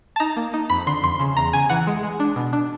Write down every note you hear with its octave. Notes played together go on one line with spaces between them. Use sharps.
A5
D#4 A#5
A#3
D#4
F2 B5
D3 C6
F2 C6
C#3
E2 A#5
C#3 G#5
E3 F#5
G#3
G#3
D4
B2
D4